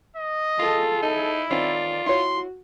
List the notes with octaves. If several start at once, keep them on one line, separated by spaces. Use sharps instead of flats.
D#5
F4 G#4 A4
D#4 E4
D#3 C4 C#4 F4 D5
E4 F#4 C#5 C6